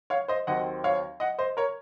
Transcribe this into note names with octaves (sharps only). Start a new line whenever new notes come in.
C#5 F5
C5 D#5
D#2 D#3 F#3 C4 D#5 F#5
C#5 F5
D#5 F#5
C5 D#5
A#4 C#5